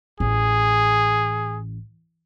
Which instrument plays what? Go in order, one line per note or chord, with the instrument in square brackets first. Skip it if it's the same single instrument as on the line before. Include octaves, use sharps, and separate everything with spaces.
[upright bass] A1 [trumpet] G#4